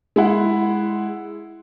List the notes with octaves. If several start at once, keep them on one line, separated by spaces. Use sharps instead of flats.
G#3 E4 F#5